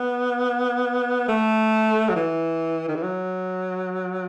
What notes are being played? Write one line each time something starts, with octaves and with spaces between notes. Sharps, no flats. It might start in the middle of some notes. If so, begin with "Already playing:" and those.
Already playing: B3
A3
F#3
E3
D#3
E3
F#3